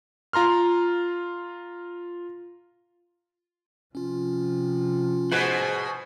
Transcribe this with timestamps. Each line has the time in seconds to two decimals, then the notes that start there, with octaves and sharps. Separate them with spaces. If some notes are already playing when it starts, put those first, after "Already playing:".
0.33 F4 A#5 C6 F6
3.95 C3 F3 C#4 F4
5.32 B2 G#4 B4 C5 F#5